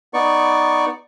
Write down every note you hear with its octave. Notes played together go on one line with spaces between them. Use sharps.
B3 D#4 D5 C#6